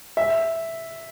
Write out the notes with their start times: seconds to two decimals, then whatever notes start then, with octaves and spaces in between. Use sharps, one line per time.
0.17 E5